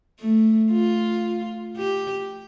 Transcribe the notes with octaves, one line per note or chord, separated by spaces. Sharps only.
A3
F4
G4